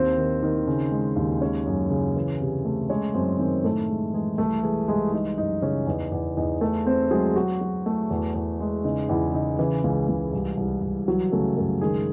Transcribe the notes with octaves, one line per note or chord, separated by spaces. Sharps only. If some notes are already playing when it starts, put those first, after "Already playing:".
Already playing: D#2 C4 C5
D#3
D#3
C#3
G#3
D#2
G#3 C#4 C#5
F#2
C#3
E3
C3
A3
G#3 C#4 C#5
F#2 C4 C5
D#3 C4 C5
A2 A3 A4
G#3
E3 G#3 G#4
C2 A3 A4
E3 G#3 G#4
C2 G#3 G#4
G#3 D#4
F#2 D#4
C#3 C#4
E2 D#4
E2
E2 D#4
A3 A4
A3 C4 C5
F#3 G#3 G#4
F#3 F#4
F#3
A3
E2
E2
G#3
C#3 D#4
E2 E3 E4
C#3 D#4
C#3 E3 E4
C#2
C#2
C2
C2
C2
E3 F#3 F#4
C#3 A3 A4
F#2 A3 A4
D#3 G#3 G#4